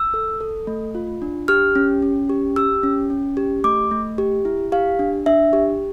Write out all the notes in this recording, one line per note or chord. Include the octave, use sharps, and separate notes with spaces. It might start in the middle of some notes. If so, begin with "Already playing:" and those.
Already playing: E6
A4
A4
A3
F4
D4
G4 F6
C#4
C#4
G4
G4 E6
C#4
C#4
G4
A3 D6
A3
G4
E4
G4 F5
D4
D4 E5
G4